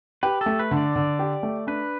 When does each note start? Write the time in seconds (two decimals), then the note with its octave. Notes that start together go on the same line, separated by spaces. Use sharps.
0.23 G4 B4
0.41 A4
0.46 A3
0.59 B4
0.71 D3
0.77 D5
0.96 D3
1.19 G4
1.43 A3
1.67 D4 B4